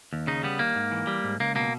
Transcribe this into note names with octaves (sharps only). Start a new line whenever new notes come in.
D#2
C#3 D#4
G3 B3
D#2 A#3
G#2
E3
G3
G#2
C#2 A#3
B2 A#3